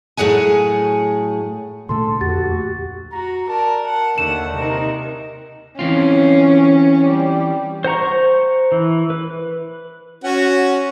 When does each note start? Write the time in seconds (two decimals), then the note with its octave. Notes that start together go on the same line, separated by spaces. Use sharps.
0.17 A2 F#3 G#4 F#5 G#5
1.89 D2 A#2 A3 A4 C6
2.21 F2 F#4 G4 A6
3.12 F#4 A#5
3.49 A#4 D5 A5
3.86 F#5 A5
4.18 D#2 D3 A3 F#5 E7
4.57 C3 D#4 A#4
5.79 E3 C4 C#4 F4
7.06 G3
7.84 C5 F#5 A#5 C#6
8.72 E3
9.10 B4
10.24 C#4 F#4 F#5